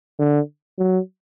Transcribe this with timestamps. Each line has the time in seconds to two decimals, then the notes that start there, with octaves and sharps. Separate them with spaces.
0.19 D3
0.78 F#3